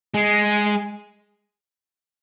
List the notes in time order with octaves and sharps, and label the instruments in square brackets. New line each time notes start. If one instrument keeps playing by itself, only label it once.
[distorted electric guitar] G#3